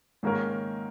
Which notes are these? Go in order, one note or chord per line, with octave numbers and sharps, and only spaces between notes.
G#2 D#3 G#3 A#3 C#4 A#4